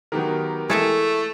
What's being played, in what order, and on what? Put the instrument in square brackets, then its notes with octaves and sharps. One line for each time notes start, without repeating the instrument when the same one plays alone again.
[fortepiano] D#3 F#3 [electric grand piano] B3 G4 A#4
[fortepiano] E3 [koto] G#3 A4 E5 [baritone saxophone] A3